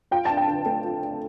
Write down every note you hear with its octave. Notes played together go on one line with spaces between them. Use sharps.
F4 G5
D4 A5
G5
D3
A3
F4
D4